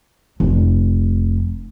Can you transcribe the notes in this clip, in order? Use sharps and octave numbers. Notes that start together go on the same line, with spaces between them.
F1